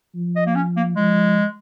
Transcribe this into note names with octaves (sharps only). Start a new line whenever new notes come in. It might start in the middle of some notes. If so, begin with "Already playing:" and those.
F3
D#5
A#3
C#4
A#3
F3 G#3